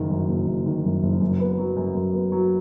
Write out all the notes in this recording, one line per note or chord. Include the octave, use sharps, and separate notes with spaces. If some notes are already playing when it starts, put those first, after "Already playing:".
Already playing: F#1 D#3
F#2
F#1
F#1
D#3
F#2
F#1
F#2
B3
F#3
F#2
F#2
B3
F#3